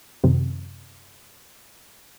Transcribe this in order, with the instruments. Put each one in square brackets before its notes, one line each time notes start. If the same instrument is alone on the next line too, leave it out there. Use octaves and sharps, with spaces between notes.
[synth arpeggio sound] F#2 C3 D#3